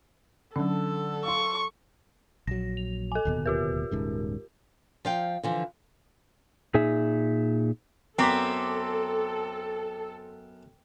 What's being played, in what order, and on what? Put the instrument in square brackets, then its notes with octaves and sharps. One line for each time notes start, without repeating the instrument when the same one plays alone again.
[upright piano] D3 [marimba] F#3 C#4 [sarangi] A4
[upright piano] F5 C6 [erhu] C#6
[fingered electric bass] A#1 F#3 [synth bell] A#6
[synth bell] F7
A4 G#5
[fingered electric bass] D1 D#2 B2
[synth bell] F4 G4 A#4
[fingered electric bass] D#1 G#2 C#3
[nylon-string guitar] F3 F5 G5
D3 E3 F3
[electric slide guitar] A#2 D#4 G#4 E5
[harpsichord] F#2 B3 [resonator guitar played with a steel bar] C4 [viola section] A4 [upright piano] A#5 D6 B6